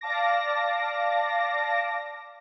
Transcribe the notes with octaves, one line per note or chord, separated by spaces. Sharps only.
D5 F5 A5 D6 A#6